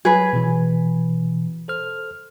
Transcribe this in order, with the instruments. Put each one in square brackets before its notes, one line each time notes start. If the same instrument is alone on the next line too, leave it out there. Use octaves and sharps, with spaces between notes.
[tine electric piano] F#3 G#6 [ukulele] G#4 B4
[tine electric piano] B2 E3
A4 C5 F6